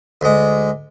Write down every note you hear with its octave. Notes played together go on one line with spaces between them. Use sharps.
D2 G#3